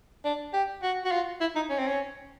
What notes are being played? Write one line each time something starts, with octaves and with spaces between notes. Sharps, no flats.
D4
G4
F#4
F#4
F4
E4
D#4
C#4
C4
C#4